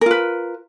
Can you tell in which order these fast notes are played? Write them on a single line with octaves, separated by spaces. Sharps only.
A#4 F4 B4